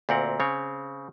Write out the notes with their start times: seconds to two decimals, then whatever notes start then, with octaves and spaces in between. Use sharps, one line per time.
0.09 D2 A#2 C4 A#4 F#5
0.40 C#3 C4 C#5